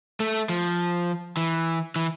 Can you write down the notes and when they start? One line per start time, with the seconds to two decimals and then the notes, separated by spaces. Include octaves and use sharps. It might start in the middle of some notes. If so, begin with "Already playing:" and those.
0.20 A3
0.49 F3
1.37 E3
1.96 E3